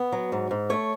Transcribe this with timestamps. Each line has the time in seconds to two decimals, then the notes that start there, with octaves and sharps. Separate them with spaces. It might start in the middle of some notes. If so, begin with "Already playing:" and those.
Already playing: B3
0.12 F#3
0.32 G#2
0.51 G#2
0.70 A3 C#5